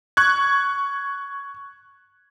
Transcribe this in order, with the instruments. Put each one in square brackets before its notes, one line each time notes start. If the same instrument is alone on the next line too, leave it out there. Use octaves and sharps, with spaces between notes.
[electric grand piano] C#6 F#6 G#6